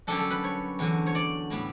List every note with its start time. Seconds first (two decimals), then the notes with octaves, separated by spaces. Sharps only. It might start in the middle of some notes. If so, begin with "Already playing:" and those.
0.07 F#2 D3 G3 D4 A4
0.19 A4
0.31 B4
0.44 C#5
0.79 E2 D3 F#3
1.06 C#5
1.15 D5
1.50 A2 G3 B3